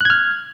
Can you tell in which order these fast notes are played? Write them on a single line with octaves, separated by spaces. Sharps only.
F#6 G#6 F6